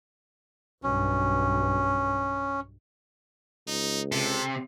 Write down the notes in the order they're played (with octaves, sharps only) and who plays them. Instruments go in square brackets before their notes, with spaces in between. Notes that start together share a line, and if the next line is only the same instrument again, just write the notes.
[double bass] B1 G2 [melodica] C#4
[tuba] C#2 [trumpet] D#4
[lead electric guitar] C3 [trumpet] A4